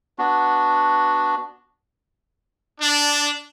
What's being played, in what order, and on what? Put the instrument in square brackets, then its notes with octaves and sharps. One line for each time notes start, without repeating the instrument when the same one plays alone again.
[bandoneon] B3 D4 F#4
[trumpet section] D4